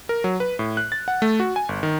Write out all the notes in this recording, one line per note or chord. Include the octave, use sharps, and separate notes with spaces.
A#4
F#3
B4
A2
F#6
A6
F#5
A3
F#4
G#5
G1
D#3